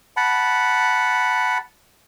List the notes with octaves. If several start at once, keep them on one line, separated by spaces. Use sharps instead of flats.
F#5 A5 B5